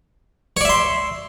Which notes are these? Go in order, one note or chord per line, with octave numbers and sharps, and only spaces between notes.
C#5 D5 E5 C6